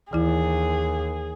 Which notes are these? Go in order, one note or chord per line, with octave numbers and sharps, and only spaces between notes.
D#2 E3 E4 G#4